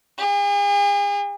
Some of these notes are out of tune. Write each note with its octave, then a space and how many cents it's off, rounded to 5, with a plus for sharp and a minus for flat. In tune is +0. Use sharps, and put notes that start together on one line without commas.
G#4 -45